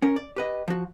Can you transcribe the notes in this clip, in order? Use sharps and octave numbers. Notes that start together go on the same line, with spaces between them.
C#4 A#4
D5
G4 B4 D#5
F3 F#4